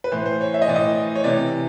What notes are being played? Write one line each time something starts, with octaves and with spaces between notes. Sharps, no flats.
B4
A2 E3 C5
C5
C#5
E5
D#5
A2 E3 D5
D#5
C#5
C3 E3 D5